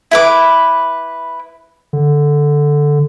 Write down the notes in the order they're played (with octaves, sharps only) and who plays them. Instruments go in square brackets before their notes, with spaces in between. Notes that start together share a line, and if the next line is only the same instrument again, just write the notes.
[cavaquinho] E4 B4 D6
[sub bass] D3